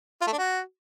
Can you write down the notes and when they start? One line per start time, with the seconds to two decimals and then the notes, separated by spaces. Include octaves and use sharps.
0.21 F4
0.27 A3
0.32 D4
0.38 F#4